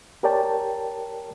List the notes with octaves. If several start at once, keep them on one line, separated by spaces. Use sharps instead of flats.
G4 A#4 C#5 D5 G5 A5